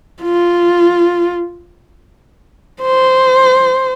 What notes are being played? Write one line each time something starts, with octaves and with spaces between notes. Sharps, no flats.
F4
C5